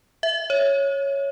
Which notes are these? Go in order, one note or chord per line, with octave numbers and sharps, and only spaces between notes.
E5
C#5